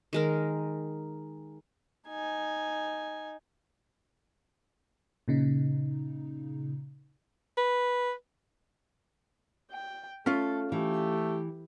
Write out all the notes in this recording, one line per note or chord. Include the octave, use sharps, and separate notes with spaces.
D#3 G#3 A#4
D#4 G#5
A#2 C#3 D#4
B4
G5
A3 C#4 F4 A4
E3 A3 G4